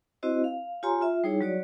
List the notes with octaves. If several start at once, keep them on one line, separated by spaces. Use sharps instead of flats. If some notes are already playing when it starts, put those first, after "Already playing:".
C4 E4 F#4 C5 D#5
F5
F4 G4 C#5 G#5 A#5 C6
F4 E5
G3 D#4 E4 G#4 C#5
F#3 F#4 C#5 D5